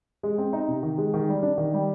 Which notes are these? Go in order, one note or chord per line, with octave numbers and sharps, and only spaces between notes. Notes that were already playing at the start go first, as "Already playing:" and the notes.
G#3
C4
D#4
C3
D#3
G#3
D#3
G3
D4
D#3
G3